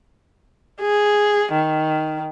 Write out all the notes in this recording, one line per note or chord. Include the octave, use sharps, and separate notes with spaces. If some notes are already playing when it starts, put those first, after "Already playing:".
G#4
D#3